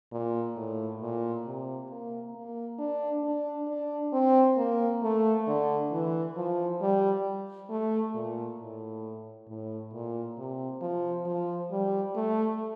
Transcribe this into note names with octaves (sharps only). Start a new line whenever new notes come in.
A#2
A2
A#2
C3
A#3
A#3
D4
D4
D4
C4
A#3
A3
D3
E3
F3
G3
A3
A#2
A2
A2
A#2
C3
F3
F3
G3
A3